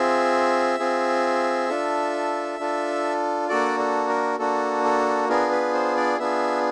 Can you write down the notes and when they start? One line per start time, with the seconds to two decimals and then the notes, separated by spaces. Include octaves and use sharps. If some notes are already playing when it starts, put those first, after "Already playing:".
Already playing: C4 F4 G#4 E5
0.79 C4 F4 G#4
1.69 D4 F4 A4
2.59 D4 F4 A4
3.49 A#3 D4 F#4 A4 D5
3.79 A4
4.09 A#4
4.39 A#3 D4 F#4 A4
4.84 A4
5.29 B3 D4 F4 G#4 A#4
5.52 B4
5.74 C5
5.97 D5
6.19 B3 D4 F4 G#4 E5